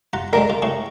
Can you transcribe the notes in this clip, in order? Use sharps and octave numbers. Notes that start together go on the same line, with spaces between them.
F4 F#5 A#5
D2 D3 G#3 A#4
F4
A2 C#3 C#6